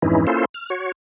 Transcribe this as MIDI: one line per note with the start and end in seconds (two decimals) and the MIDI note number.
0.02 0.26 41
0.02 0.26 44
0.02 0.26 52
0.02 0.26 61
0.02 0.26 63
0.02 0.26 64
0.27 0.45 58
0.27 0.45 61
0.27 0.45 64
0.27 0.45 65
0.27 0.45 69
0.27 0.45 72
0.54 0.70 89
0.70 0.92 66
0.70 0.92 73